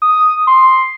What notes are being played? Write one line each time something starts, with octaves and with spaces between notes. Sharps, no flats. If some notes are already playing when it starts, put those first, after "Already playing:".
D#6
C6